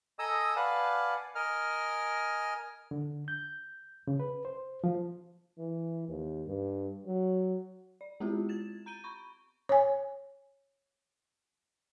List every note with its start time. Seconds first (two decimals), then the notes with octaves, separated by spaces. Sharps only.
0.19 A4 D#5 G#5 A#5 D#6 E6
0.56 B4 D5 F5 F#5 G#5 A5
1.35 A#4 D#5 G#5 F6
2.91 D3
3.28 G6
4.07 C#3
4.20 B4
4.45 C5
4.84 F3
5.58 E3
6.09 D#2
6.47 G2
7.06 F#3
8.01 D5
8.20 G#3 B3 C4 E4 F4 G4
8.49 G#6 A6 E7
8.86 A#5 G6 D7 D#7 G7
9.04 B5 C#6
9.69 C#5 G#5